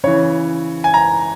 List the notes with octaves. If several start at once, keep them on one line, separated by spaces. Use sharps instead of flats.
C#3 E3 C#5
G#5
A#5